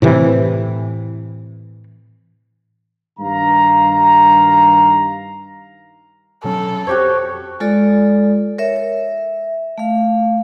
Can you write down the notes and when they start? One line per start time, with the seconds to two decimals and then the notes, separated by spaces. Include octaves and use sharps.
0.02 A2 C3 E3
3.19 G2 D#3 F5 A#5
6.44 B2 F#3 C#4 A4
6.87 F2 F#4 G4 C5 C#5
7.60 G#3 F4 A4 D5
8.58 A#4 C#5 E5
8.76 E5
9.78 A3 F5